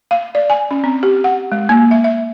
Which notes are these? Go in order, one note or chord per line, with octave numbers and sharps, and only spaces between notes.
F5
D5
G#5
C#4
C4
G4
F#5
G#3
A#3
E5
E5